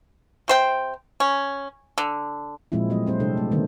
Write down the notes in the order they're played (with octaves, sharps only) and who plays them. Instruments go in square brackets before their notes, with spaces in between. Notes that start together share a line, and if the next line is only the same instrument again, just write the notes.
[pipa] C3 C5 G5
C#4
D3
[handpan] A#2 F3 G#3 C4 E4
F#3 G#3 A3 C4 D#5
G3 C4 C5
C3 G#3 D4 A4
A3
D3 D#3 G3 A#3 B3 D4